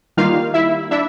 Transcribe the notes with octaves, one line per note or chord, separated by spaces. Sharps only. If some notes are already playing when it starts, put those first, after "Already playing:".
D#3 G3 A#3 D#4 F4 F5
E4 E5
D4 E4 E5